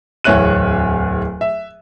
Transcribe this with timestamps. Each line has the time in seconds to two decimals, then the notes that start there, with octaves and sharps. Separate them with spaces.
0.24 D1 E2 C#5 E5 F#6 D#7
1.41 E5